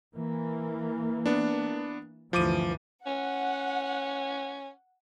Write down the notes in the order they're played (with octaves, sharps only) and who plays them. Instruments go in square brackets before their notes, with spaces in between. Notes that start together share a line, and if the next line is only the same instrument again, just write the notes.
[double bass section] E3 A#3
[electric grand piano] B3 D4
[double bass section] D2 G2 E3 [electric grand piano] F3 D6 D#7
[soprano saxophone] C#4 [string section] F#5